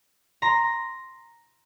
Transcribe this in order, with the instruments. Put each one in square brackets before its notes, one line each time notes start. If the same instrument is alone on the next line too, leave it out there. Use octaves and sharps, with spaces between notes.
[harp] A#5 C6